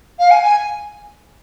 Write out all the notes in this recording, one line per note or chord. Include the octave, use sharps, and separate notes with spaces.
F5
G#5
G#5